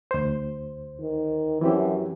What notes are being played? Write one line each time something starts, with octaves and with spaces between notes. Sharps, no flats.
D2 C5
D#3
F#2 E3 C4 G4